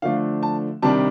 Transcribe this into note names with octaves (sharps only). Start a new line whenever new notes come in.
D3 F3 A3 D4 F5
A5
C3 D#3 G3 D4 A5